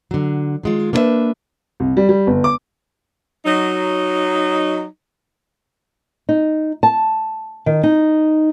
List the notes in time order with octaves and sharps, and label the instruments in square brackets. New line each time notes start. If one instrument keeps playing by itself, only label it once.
[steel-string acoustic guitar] D3 F#3
D#3 G#3 F4
A#3 D4 E4 A4 B4 E5
[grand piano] C2
G3
G3
G1
D6
[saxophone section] F#3 D#4
[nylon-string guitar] D#4
A5
D#3
D#4